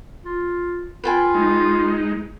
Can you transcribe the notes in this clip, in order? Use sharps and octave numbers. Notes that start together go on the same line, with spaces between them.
F4
F4 B4 G5 G#5
G#3 D#4